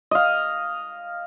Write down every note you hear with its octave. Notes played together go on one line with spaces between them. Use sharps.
D#5 F5